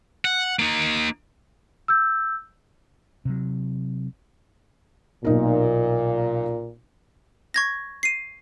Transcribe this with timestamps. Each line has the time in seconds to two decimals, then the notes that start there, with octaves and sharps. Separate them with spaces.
0.25 F#5
0.59 A#3 D#4
1.88 E6 G6
3.25 C3 F#3
5.25 B1 A#2 D#4 A#4
7.54 C#6 G#6 A#6
8.03 C7 D#7